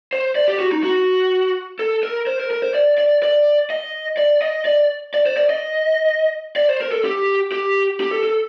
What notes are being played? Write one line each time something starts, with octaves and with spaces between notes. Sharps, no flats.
C5
D5
G4
F#4
D#4
F#4
A4
A#4
C5
A#4
A#4
C5
D5
D5
D5
D#5
D5
D#5
D5
D5
C5
D5
D#5
D5
C5
A#4
A4
G4
G4
G4
A4
A4